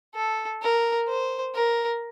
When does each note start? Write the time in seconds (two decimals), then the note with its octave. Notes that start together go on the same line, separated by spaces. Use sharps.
0.15 A4
0.62 A#4
1.08 C5
1.55 A#4